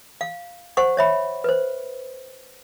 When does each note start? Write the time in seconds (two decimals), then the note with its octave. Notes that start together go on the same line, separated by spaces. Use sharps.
0.21 F5
0.77 C5 F#5 C#6
0.97 C#5 E5 B5
1.44 B4 C5